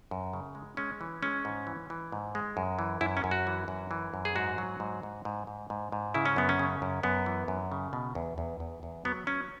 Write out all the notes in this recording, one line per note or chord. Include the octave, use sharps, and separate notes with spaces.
F#2
C#3
G#3
G#3 C#4
E3
G#3 C#4
G#2
E3
E3
G#2
G#3
F#2
E3
F#2 E4
C#4
F#2
F#4
E3
F#2
E3
F#2
G#4
G#2 F#4
F#3
G#2
G#2
G#2
G#2
G#2
G#2
C#3 E4
C#4
F#2 B3
C#4
C#3
F#2
F#2 B3
E3
F#2
C#3
B2
E2
E2
E2
E2
F#3 B3
F#3 C#4